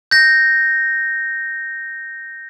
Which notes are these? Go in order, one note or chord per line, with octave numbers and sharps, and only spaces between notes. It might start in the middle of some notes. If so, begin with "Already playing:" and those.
G6 A#6